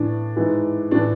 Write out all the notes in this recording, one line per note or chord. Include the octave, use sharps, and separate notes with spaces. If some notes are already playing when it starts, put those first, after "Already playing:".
Already playing: A2 E3 D4
G#2 E3
A2 E3 D4